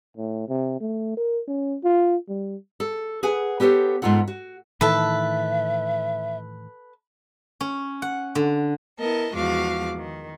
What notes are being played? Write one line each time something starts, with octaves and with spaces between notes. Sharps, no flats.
A2
C3
A3
A#4
C#4
F4
G3
A4
G#4 B4 F#5 G#5
B3 G4 A4 C5 C#5
G#2 B3 F4 A4 F#5
F#4
A2 D#3 E3 A4 B4 E5
C#4
F#5
D3
B3 E4 A#4 D#5 A5
E2 F3 G#3 F#4 F5 D6
D#3